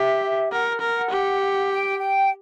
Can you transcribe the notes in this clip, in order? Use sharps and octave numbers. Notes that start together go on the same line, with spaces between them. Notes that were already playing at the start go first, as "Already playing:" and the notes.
Already playing: G4 E5
A#4 F#5
A#4
G4
G5
G5